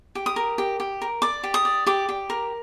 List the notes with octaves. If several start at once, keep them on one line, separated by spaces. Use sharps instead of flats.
G4
D#6
A#4
G4
G4
A#4
D5 D6
G4
D#6
D5
G4 D6
G4
A#4